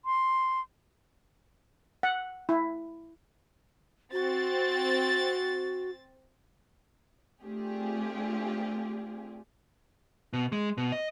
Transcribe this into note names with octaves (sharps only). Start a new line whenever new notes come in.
C6
F#5
E4
C4 F#4 A6
A3 C4 D4 F4 G4 G#4
B2
G#3
B2
D#5